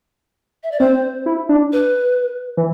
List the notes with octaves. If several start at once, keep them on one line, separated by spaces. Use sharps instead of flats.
E5
D5
C4 C5
E4
D4
B4
E3